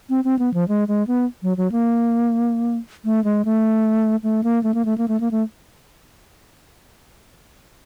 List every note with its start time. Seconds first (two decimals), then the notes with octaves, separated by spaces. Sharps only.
0.10 C4
0.24 C4
0.39 B3
0.54 F3
0.68 G#3
0.88 G#3
1.07 B3
1.43 F#3
1.57 F#3
1.72 A#3
3.05 A3
3.24 G#3
3.45 A3
4.23 A3
4.44 A#3
4.63 A3
4.74 A#3
4.85 A3
4.98 A#3
5.08 A3
5.20 A#3
5.31 A3